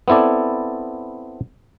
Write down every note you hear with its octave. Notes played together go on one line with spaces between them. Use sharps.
B3 C4 E4 A4 D5